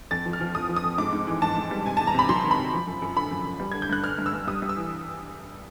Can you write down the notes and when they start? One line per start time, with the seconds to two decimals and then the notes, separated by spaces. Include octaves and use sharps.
0.11 F2 A6
0.26 F3
0.33 F6
0.40 F3
0.55 F2 D#6
0.69 F3
0.76 D#6
0.84 F2
0.98 G#2 D6
1.13 G#2
1.27 E3
1.42 G#2 A5
1.57 G#2
1.71 G3
1.85 C3 G#5
1.97 E2 A5
2.07 A#5
2.14 C3 B5
2.29 F#3 C6
2.44 D#3
2.51 B5
2.58 C3
2.73 F3
2.88 F#2
3.02 F#2
3.17 D3 B5
3.31 F#2
3.46 F#2
3.60 G3
3.72 D3 G#6
3.82 G6
3.89 G2 F#6
4.04 D3 F6
4.18 G2
4.26 E6
4.33 G2
4.47 G3 D#6
4.62 G3
4.69 E6
4.77 E3